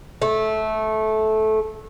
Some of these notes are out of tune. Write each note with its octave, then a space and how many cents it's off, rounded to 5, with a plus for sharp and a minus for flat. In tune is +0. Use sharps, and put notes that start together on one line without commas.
A3 -15